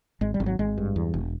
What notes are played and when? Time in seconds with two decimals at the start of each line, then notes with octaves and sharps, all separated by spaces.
0.21 G#1 G#3
0.34 G3
0.40 G#1
0.46 F#3
0.59 G#1 G#3
0.78 G2
0.96 E2
1.14 E1